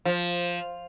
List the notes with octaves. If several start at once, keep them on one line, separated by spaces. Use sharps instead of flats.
F3